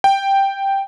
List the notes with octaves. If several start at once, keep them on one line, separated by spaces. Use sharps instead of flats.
G5